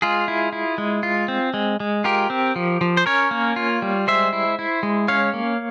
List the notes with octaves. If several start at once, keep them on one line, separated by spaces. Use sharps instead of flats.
G#3 F4 G#4
E4
E4
G#3
F4
C4
G#3
G#3
F4 G4 A#4
C4
F3
F3
C5
C#4 A#4 C#5
A#3
F4
G3
G#3 C5 E5
E4
E4
G#3
C#4 C#5 F5
A#3